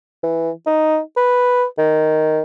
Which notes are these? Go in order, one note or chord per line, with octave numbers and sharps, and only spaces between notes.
E3
D#4
B4
D#3